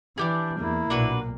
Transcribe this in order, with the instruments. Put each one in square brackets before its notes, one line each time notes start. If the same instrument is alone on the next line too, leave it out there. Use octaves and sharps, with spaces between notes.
[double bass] E3 [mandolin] D4 G4 G#4
[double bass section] E2 [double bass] A#3 [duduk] E4
[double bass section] B1 A#2 [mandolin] D4 F#4 B4